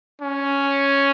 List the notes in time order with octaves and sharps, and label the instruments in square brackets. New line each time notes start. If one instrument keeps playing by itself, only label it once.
[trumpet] C#4